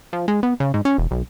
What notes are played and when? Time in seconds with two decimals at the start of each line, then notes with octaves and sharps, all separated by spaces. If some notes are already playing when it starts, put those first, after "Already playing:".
0.13 F3
0.28 G#3
0.43 B3
0.60 C#3
0.74 G#2
0.85 C#4
0.98 E1
1.11 B1